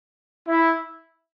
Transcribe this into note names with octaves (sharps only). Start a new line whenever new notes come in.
E4